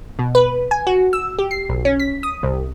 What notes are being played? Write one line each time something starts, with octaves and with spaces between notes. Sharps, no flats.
B2
B4
G#5
F#4
E6
G4
C7
B1
C#4
B6
D#6
C2